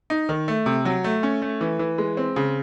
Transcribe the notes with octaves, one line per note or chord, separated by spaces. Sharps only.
D#4
D#3
A3
C3
F#3
A3
C#4
A3
E3
E3
G#3
C4
C#3